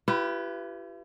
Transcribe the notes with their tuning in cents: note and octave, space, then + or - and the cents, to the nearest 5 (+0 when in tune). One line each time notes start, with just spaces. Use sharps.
E4 +45 G4 -20 B4 +0